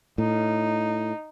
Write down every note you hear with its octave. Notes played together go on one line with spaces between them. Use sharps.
A2 D#4